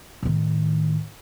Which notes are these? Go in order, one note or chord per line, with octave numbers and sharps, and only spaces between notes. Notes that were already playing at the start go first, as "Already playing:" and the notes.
A2 D#3